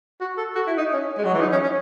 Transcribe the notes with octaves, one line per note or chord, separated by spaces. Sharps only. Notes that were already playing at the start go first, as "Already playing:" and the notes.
F#4
A4
F#4
E4
D#4
C#4
G#3
F#3
E3
D#4
C#4
C#4